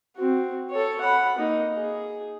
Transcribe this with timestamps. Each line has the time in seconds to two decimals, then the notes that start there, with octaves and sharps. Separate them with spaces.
0.16 C4 F#4
0.70 A4 C#5
1.01 F#5 B5
1.38 A#3 D#4
1.76 G#4